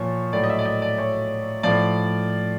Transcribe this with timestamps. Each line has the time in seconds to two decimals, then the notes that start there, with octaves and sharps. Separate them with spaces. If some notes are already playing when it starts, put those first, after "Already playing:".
Already playing: A#2 F3 C#5
0.33 A2 F#3 D5
0.43 D#5
0.49 E5
0.59 D5
0.65 D#5
0.82 D5
0.98 C#5
1.63 A2 F3 D5